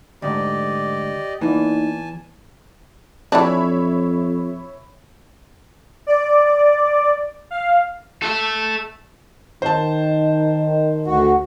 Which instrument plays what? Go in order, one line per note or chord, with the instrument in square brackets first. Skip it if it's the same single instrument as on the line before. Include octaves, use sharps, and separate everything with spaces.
[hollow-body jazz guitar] D2 G#2 [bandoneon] G4 D5 D#5
[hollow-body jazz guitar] E2 E3 [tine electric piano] A#3 D#4 [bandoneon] G#5 A5
[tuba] F2 [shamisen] E3 D4 [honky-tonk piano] C#5 E5 B5
[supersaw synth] D5
F5
[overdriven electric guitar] A4 E5
[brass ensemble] D#3 [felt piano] C5 A5
[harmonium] D2 F#4